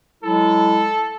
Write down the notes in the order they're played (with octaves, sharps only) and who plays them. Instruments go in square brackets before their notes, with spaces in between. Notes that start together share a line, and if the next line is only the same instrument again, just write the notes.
[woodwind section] F#3 G#3 E4 [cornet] A4